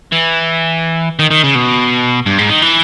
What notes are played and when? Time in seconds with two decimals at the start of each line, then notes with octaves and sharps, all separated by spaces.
0.12 E3
1.19 D#3
1.31 D#3
1.44 C#3
1.55 B2
2.26 G2
2.38 G#2
2.49 D#3
2.62 E3